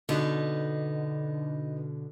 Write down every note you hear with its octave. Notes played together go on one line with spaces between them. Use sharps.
B2 D3 B3 D#4